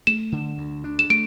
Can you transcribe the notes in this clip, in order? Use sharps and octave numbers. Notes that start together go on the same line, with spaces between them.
A3 E7
D3
D2
D4
E7
A3 D7